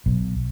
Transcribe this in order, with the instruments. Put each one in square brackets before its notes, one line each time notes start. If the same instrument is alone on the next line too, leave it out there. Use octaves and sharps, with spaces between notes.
[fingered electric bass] B1